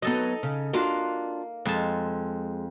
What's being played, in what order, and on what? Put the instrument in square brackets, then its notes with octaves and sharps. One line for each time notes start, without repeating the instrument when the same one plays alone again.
[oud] F#3 B3 [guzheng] D#4 A4 D#5
[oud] C#3
[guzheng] A#3 [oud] D4 F4 F#4
[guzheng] F2 A5 [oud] G#3